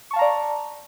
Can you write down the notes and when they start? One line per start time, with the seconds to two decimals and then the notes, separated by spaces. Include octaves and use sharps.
0.11 C#6
0.13 A5
0.16 F5
0.19 A#5
0.22 D5